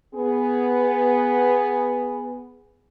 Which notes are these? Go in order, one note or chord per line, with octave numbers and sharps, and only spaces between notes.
B3 G#4